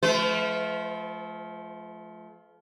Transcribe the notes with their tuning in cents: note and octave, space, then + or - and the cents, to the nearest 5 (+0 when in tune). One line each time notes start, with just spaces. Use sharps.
F3 +0 A3 -35 B4 +45